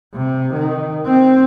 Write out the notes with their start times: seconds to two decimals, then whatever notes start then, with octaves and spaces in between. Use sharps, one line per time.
0.15 C3
0.54 D#3
1.06 C4